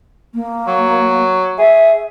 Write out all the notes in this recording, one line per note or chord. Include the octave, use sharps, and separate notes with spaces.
A#3
F#3
G#4 E5